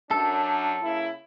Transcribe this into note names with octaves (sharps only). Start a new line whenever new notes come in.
F#2 D4 A4
C#3 A#3 E4